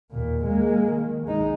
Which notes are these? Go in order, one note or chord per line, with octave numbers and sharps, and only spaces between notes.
D#2 A#2
G#3 A#3
D#3
G#3 D#4